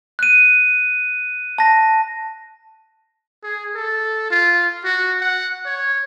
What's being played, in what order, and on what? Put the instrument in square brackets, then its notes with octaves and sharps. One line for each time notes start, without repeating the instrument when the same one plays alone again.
[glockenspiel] F#6 D#7
A5 A#6
[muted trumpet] G#4
A4
F4
F#4
F#5
C#5